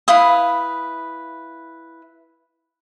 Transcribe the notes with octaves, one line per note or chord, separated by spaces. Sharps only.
E4 B4 F5 D#6